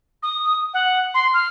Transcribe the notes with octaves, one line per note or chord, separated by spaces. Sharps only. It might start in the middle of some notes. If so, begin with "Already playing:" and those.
D#6
F#5
C6
F6